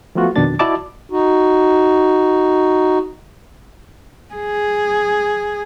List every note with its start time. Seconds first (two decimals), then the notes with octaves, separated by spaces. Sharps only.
0.15 F3 A3 B3 F4 F#4
0.36 F2 B2 D#3 D4 A6
0.59 E4 F#4 D5 D#5 A5 D6
1.10 D#4 F#4
4.34 G#4